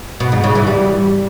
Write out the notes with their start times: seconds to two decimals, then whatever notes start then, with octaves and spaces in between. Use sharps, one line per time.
0.20 B2
0.32 G#2
0.44 C#3
0.55 E3
0.67 G3